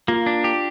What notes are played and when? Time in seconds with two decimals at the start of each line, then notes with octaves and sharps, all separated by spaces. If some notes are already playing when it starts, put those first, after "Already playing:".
0.08 A#3 F4
0.26 D4
0.44 G4